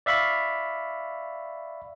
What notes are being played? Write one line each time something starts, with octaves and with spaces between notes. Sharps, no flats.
D5 E5 F5 B5 C#6